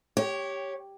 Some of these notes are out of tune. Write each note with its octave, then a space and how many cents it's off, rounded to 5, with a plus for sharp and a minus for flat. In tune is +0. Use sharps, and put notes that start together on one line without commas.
G4 +0 C#5 +0 G5 -40